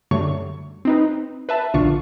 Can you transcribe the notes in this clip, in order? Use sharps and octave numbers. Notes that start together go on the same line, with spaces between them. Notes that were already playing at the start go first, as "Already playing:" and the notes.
F#2 D3 G3 A3 C#5 C#6
C4 D#4 B4
B4 E5 A5
A#1 A#2 D3 D4 F4 C#6